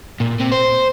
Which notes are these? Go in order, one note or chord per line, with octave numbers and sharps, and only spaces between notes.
A#2
C3
C5